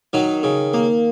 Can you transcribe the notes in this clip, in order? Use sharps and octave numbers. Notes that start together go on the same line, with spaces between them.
D#3 F#3 D#4
C#3
A#3